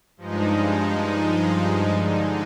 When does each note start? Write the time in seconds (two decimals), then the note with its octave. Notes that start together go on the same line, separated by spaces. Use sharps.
0.17 G2 F3 G#3 D#4
1.96 D3 G#3 D#4